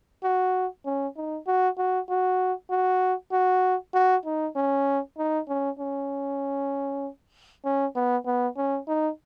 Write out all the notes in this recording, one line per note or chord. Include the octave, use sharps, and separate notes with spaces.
F#4
C#4
D#4
F#4
F#4
F#4
F#4
F#4
F#4
D#4
C#4
D#4
C#4
C#4
C#4
B3
B3
C#4
D#4